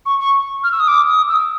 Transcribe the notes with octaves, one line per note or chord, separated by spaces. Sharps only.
C#6
C#6
F6
E6
D#6
D6
D#6
E6